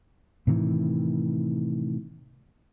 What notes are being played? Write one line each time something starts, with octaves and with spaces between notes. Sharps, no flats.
A2 C3 D#3 E3